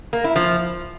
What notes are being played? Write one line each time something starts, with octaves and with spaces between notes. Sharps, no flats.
A#3
E4
F3